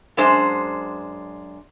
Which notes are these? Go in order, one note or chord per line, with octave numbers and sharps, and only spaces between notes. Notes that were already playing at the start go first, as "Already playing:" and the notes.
F#2 G#3 D4 C5